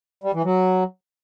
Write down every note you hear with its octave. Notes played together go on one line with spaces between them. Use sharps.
G3
E3
F#3